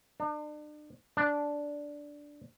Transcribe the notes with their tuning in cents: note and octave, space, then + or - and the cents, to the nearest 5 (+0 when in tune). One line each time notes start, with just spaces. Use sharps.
D4 +40
D4 -5